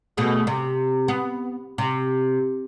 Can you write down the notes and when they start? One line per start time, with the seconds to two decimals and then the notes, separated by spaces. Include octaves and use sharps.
0.17 B2 A3 G#4
0.47 C3
1.08 B3
1.78 C3